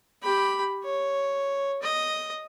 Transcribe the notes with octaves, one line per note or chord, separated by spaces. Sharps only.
G4 B5
C#5
D#5